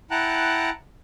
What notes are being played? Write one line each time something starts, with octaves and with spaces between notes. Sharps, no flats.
E4 F#5 G5 A5 A#5 F#6